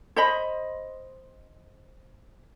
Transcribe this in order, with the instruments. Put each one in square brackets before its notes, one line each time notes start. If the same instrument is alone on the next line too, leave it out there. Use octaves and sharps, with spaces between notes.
[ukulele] C5 D#5 B5